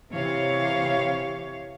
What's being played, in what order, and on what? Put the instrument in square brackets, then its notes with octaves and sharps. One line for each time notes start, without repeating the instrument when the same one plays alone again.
[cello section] C3 E3 G4 C#5 F5